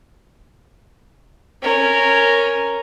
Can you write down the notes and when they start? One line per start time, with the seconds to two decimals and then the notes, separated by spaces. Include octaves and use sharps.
1.62 C#4 A#4